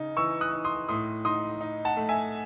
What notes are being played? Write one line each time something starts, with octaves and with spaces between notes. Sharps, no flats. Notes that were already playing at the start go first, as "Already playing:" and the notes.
Already playing: C#3 D#4
E3 C#6 E6
D#6 F#6
D#4
C6 D#6
A2 C6 D#6
D#4 C6 D#6
D#4
F#5 A5
A3
E5 G#5